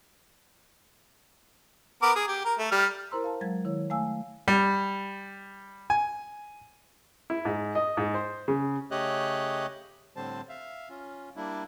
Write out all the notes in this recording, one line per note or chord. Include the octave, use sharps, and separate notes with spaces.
B3 A#4 D6
G#4
G4
A#4
A3
G3 F6
E4 A#4 C5 A#5 C6 E6
F5 A5
F#3 G#3 G#6
D#3 E4 C#5
A3 F5 G#5 E6
G3
G#5
E4
G#2
D#5
G#2
C5
C#3
C#3 A3 G4 C#5 D#5 F#6
A2 D3 G3 C4 C5 A5
E5 F5
C#4 F4
G3 A#3 D4 E4